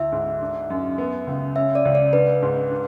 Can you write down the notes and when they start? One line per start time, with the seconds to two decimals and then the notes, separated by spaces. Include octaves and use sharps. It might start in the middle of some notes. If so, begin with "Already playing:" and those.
Already playing: D2 E4 E5
0.12 G#2
0.41 D4
0.70 F#2
0.98 B3
1.27 C#2
1.56 C#4 E5
1.75 D5
1.85 C#2
1.95 D5
2.13 D4 B4
2.42 G#2
2.71 D4